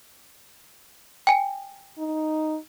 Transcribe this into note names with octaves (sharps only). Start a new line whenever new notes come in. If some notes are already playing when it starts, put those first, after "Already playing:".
G5 G#5
D#4